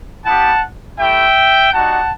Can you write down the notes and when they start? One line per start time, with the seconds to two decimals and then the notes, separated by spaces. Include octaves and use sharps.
0.25 B3 E4 G4 F#5 A5
0.98 A3 E4 G4 E5 G5
1.72 G3 D#4 F#4 F#5 A5